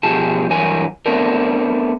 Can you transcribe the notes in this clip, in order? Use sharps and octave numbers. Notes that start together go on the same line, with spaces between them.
B2 F3 G4 G#4 A5
G2 E3 F#3 A#4 G#5
A3 B3 C4 D4 A#4